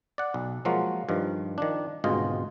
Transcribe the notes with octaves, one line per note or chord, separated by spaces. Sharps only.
D5 F#5
B1
F3 F#3 G#3 A#3 F4 F#4
G2 D#3 F3
D#3 F3 D4
G#1 D2 B2 G#3 F4 D#5